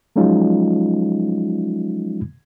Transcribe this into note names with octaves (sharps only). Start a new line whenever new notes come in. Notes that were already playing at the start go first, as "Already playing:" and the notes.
F3 F#3 G#3 C#4 D#4 F4